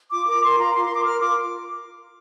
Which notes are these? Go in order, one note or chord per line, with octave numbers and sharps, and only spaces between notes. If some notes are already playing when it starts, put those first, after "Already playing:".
F4 D6
A#4 D6
A#4 C6
F4 A#5
F4 C6
C6
A#4
D6
A#4 F6
F4 D6